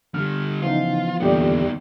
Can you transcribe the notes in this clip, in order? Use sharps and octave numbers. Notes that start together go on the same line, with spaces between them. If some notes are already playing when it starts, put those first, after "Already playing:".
D3 G3 F6
C#3 E3 F3 B3 D#4 F4
E2 A#2 D3 D#3 G3 B3 G4 D5